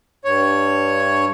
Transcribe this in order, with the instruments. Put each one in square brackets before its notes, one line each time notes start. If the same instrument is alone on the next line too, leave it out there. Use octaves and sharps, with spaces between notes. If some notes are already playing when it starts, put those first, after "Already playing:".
[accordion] G2 C#5